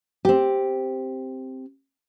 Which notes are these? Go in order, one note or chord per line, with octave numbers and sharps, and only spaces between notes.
C4 G4